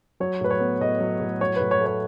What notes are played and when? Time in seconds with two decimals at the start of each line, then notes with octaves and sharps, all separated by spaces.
0.20 F#3 C#5
0.41 A2 B4
0.51 C#5
0.60 B3
0.81 A2 D#5
1.00 F#3
1.20 A2
1.41 F#3 C#5
1.56 A2 B4
1.71 C#5
1.80 A3
1.86 C#5